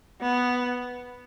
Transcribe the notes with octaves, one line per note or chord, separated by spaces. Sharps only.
B3